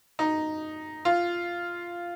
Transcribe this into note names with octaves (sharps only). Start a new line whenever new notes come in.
D#4
F4